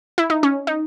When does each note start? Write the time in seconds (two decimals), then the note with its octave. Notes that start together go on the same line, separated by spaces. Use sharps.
0.18 E4
0.30 D#4
0.43 C#4
0.67 D#4